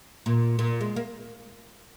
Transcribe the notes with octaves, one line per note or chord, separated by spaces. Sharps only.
A#2
A#2
G#3
A#3